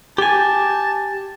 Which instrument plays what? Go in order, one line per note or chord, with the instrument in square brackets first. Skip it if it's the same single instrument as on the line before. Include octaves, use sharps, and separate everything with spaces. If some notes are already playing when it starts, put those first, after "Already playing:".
[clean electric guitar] G4 G#5 [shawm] A5